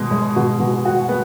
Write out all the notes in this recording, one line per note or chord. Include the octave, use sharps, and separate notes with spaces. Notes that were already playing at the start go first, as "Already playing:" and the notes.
Already playing: B2 G#3
G#3
B2
B2
F#4
B3